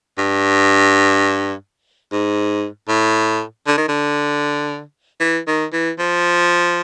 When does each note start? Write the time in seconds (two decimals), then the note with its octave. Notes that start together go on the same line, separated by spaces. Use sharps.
0.18 G2
2.12 G#2
2.89 A2
3.67 D3
3.77 D#3
3.89 D3
5.21 E3
5.47 D#3
5.73 E3
5.99 F3